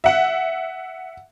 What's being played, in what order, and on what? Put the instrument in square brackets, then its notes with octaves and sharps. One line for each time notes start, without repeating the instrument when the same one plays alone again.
[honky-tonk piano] E5 F#5